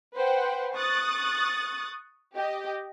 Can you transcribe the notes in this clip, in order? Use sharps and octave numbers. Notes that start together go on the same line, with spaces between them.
B4 C5 F#5 G5
C#6 D#6 F#6 A6
G4 D#5